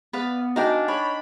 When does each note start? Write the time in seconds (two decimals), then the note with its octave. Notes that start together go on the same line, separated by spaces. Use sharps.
0.13 B3 B4 D5 F5
0.56 D4 D#4 F#4 F5 G5 G#5
0.88 C#5 B5